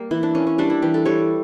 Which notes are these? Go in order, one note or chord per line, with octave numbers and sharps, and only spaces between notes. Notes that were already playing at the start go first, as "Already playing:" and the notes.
Already playing: G3 A#3
E3 E4
D4
A#3 C#4
C#4
G3 D4
E4
E3 G4
A4
G3 C#5